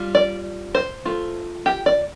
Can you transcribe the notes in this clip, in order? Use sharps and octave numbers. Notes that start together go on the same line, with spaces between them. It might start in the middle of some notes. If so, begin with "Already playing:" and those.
Already playing: G3 F4
D5
C5
A3 F4
G4
D5